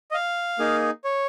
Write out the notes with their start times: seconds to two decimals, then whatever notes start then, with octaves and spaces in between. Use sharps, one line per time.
0.11 D#5
0.14 F5
0.59 A#3 D#4 G#4
1.04 C#5